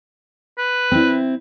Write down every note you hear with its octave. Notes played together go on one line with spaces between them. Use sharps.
B4
C4 E4